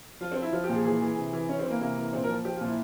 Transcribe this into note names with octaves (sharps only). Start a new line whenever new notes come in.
F3 F4
C4
F3
E4
F3 F4
G4
A#2
G#4
E3 G#4
E3
C3
E3
E3 C#4
C4
E3
A#3
C3 A#3
E3
A#2 C4
A#4
F3
F3 G4
F4
A#2
E4